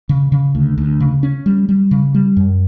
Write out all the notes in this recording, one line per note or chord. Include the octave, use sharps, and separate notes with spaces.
C#3
C#3
D2
D2
C#3
C#4
G3
G3
C#3
G3
F#2